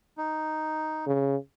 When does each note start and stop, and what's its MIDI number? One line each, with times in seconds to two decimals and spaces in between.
0.17 1.05 63
1.07 1.36 49